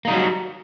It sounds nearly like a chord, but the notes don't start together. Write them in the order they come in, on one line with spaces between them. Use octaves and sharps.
A#3 D#4 G3 F#3